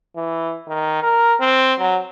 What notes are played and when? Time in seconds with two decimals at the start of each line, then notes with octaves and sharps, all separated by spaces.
0.16 E3
0.67 D#3
1.03 A#4
1.40 C4
1.79 F#3